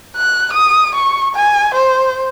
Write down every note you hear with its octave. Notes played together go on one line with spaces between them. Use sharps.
F#6
D#6
C#6
G#5
C5